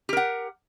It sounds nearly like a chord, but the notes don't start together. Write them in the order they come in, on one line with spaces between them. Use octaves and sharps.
G4 A#4 F#5